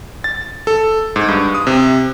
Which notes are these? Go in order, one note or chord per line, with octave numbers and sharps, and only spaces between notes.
A6
A4
G#2
G2
D#6
C3